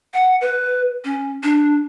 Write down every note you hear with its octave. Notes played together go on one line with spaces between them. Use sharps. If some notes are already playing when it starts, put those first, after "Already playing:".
F#5
B4
C#4
D4